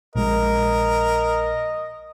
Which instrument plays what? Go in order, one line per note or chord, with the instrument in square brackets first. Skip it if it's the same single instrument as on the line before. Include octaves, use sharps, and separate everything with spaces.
[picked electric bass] A#1 G#3 [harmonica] A#4 [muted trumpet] D#5